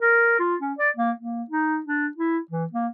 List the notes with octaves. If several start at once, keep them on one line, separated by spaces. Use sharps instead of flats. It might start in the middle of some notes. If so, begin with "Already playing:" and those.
A#4
F4
C#4
D5
A#3
A#3
D#4
D4
E4
E3
A#3